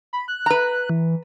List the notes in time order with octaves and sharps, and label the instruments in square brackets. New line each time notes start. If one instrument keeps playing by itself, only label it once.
[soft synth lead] B5
F#6
[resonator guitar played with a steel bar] B4 A#5
[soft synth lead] E3